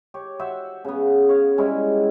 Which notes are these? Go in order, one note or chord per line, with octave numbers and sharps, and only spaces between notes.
G4 C#5
F#4 C5 E5 F#5
C#3 B3
C#5 F5
G3 G#3 C#4 E4